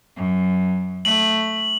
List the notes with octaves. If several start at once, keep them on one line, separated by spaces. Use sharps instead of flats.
F#2
A3 F#7